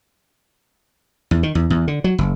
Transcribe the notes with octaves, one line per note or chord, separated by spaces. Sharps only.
E2
D#3
E2
E2
D3
F#3
F#1